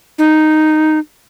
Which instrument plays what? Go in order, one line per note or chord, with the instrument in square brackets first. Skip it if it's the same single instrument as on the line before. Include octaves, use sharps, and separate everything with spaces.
[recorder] D#4